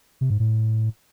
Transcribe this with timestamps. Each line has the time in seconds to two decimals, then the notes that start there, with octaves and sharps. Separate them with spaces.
0.21 C3
0.30 G#2
0.40 A2